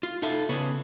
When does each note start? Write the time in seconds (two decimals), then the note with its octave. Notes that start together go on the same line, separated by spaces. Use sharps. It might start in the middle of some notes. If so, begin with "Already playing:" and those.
0.03 F4
0.22 D#4 F4 A4 E5
0.49 C#3 B3 C#4